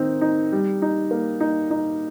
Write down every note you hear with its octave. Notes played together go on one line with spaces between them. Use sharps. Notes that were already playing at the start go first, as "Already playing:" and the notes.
Already playing: D#3 C4 D#4
D#4
G3
D#4
A#3
D#4
D#4